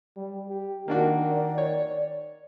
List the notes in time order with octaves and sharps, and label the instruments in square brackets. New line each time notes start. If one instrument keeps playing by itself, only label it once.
[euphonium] G3
G4
[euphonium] D#3 [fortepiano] A#3 D4 F#4
[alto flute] D5
[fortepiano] C#5